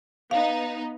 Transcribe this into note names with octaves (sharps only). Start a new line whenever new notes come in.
B3 D#4 F5